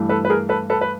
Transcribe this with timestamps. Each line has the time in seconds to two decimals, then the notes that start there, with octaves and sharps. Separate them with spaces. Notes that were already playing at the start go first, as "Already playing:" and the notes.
Already playing: G2 E3 A3
0.09 A4 B4
0.25 B4
0.30 G#4 A#4
0.49 A4 B4
0.70 A4 B4
0.81 B4